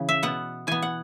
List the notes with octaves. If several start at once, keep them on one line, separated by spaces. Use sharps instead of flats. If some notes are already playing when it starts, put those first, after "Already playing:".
Already playing: C#3 E3
E5
B2 B3 F#5
E3 B3 G#5
F#5